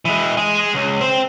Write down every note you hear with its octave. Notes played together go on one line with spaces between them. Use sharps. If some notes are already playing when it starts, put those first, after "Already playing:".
E3 G#3
G#3 G#4
C#2
C4 C5